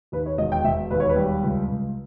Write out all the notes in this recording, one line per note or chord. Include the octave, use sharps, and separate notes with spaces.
D#2 B4
C#5
E1 D#5
G5
E1 E5
D#2 B4
C#5
B4
G3
C#2
C#2